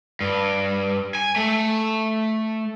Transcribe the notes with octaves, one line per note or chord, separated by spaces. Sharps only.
G2
G#5
A3